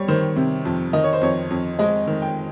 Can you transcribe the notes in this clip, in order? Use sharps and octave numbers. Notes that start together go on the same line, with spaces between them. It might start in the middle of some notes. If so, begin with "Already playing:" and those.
Already playing: G3 C#5
D#3 C5
C3
F2
D#3 D#5
C#5
C5
F2 C#5
F2
G#3 D#5
D#3
G5